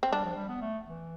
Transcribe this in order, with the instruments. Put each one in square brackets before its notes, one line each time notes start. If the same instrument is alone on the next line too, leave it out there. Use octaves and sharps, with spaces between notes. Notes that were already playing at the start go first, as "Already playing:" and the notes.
[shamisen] C4
[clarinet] G3 [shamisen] D4
[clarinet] F3
G3
B3
A3
E3